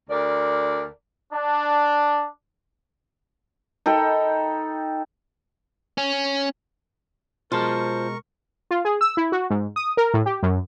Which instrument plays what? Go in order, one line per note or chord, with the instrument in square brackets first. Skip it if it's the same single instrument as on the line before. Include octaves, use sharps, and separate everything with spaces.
[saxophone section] D2 A#4 D5
[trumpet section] D4
[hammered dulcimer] D#4 A4 G5 B5
[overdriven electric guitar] C#4
[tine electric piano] B2 G#3 [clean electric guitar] F4 A5 [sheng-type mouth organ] A#4 C#6 [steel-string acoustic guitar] C5
[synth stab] F4
G#4
E6
E4
F#4
G#2
D#6
A#4
A2
G4
F#2